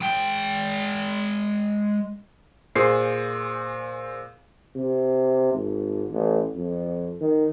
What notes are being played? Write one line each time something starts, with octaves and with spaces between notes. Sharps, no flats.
G#3 G5
A#2 G#4 C5 C7
C3
G#1
A1
F2
D#3